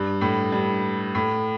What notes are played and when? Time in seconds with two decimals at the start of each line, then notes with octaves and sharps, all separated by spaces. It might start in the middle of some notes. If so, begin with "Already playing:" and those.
Already playing: G2
0.21 A2
0.52 G2
1.15 A2